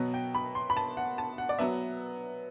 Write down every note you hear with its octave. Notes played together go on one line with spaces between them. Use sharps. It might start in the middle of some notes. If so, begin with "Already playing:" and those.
Already playing: B2 F#3 B3
G5
B5
C6
B5
A5
F#5
A5
F#5
D5
F#3 B3 E5